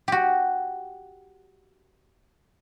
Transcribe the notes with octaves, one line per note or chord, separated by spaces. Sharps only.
F#4 G4